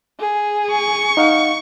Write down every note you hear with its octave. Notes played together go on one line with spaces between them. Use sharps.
G#4
C#6
D#4 F5 F#5